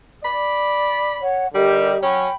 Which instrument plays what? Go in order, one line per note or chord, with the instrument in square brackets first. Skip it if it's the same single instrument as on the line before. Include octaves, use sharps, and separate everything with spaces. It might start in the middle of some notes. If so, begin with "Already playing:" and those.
[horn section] D5 B5
[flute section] C#5 F#5
[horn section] D3 G3 [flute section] G4 A#4 D#5
[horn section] F#3 C#4 [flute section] G5 B5